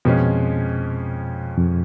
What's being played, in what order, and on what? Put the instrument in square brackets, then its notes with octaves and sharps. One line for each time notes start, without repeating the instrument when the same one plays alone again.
[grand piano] F2 F3 G#3 C#4 [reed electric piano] B2
[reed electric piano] F2